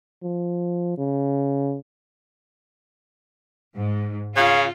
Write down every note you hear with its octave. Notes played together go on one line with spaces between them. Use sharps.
F3
C#3
G#2
C#3 F4 F5